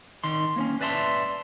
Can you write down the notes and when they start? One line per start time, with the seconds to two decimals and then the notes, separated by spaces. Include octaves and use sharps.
0.24 D#3 C6
0.56 A#3 C4 C#4
0.81 B4 D5 E5 A5 C6